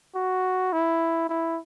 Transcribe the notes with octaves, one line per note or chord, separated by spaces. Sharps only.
F#4
E4
E4